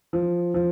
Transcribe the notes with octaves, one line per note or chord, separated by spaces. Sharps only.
F3
F3